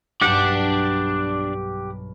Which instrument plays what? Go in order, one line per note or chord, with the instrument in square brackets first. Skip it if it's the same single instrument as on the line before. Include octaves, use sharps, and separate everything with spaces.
[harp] B1 G2 [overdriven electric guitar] D4 D5 [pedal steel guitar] G4 F#5